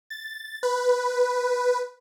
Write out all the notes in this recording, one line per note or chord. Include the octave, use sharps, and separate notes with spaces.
A6
B4